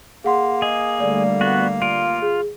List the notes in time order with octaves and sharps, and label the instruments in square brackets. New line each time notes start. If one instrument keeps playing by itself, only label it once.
[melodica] A#3 [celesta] G#4 F#5 C6
[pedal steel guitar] G#4 [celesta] D#5
[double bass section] D3 G3 A3 [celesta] D5
[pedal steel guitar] B3 F#4
[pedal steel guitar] F4 [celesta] D7
[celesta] G#4